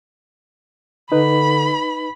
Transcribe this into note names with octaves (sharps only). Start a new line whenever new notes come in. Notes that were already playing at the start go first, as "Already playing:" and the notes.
D3 D#4 B4 B5